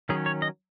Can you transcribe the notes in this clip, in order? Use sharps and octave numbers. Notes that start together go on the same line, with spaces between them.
D#3 F#3 C#4 G#4
C#5
D#5